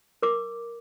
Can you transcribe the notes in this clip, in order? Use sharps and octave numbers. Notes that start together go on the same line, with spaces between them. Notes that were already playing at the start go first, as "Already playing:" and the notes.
A#4 D6